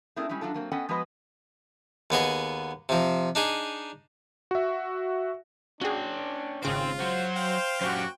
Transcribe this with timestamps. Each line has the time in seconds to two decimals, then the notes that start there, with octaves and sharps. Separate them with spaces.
0.16 A3 C4 D4 E4 G#4 A#4
0.29 G3 G#3 C#4 E4
0.41 F#3 D4 F4 A4
0.54 F#3 A#3 C4
0.72 B3 C#4 A4 D#5 F#5 G5
0.89 F3 G#3 B3 F#4 B4 D#5
2.10 D#2 B3 G#4 D#5
2.89 C3 F3
3.35 D4 D#4 G#4
4.51 F#4 E5
5.81 C#4 D4 F#4 G#4 G5
6.63 G#1 C#3 C4 F4 C5 D7
7.00 F#3 F#4 C5
7.36 F5 G5
7.82 F#2 A#3 C#4 F#4 G4 C5